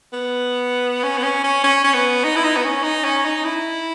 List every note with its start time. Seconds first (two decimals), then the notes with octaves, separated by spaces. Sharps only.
0.13 B3
1.03 C#4
1.17 B3
1.23 C#4
1.44 C#4
1.64 C#4
1.84 C#4
1.94 B3
2.24 D#4
2.36 E4
2.44 D#4
2.57 B3
2.64 C#4
2.84 D#4
3.05 C#4
3.25 D#4
3.44 E4